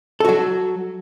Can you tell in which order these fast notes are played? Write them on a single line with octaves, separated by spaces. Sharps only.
A4 F#4 F#3